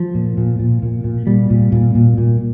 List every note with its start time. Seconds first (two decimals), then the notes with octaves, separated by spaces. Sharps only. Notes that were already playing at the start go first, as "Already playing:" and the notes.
Already playing: F3
0.15 A#2
0.37 A#2
0.59 A#2
0.82 A#2
1.04 A#2
1.27 A#2 G3
1.50 A#2
1.72 A#2
1.95 A#2
2.18 A#2